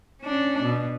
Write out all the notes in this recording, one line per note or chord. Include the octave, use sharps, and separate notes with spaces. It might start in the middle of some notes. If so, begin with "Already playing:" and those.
C#4 D4
B2